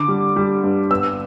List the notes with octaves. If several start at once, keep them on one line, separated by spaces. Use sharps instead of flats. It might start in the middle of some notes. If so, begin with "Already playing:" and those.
Already playing: D3 D6
G3
G3
G2
B3 E6